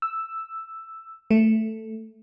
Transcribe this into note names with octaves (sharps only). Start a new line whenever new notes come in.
E6
A3